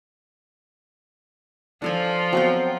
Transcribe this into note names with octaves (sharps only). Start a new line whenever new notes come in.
F3 D4 F4 A4 G#5
F#3 B3 C4 G5